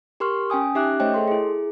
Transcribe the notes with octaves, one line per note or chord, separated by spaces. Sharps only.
G4 A#4 C6 C#6 F6
C#4 G5 G#5 D#6
C#4 D#4 G4 E5 D6 F#6
A3 C5 C#5 D#5 E5 G5
G#4 A4 C6
E4 G#4